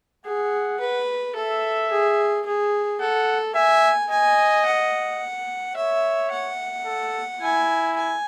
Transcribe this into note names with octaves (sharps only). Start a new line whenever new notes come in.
G#4 F#5
B4
A4 E5
G#4
G#4
A4 F#5
E5 G#5
D#5 G#5
F#5
C#5 E5
F#5
A4
E4 G#5
G#5